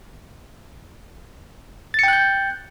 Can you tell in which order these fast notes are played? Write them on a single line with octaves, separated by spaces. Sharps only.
A6 C#7 G5 F#6 G6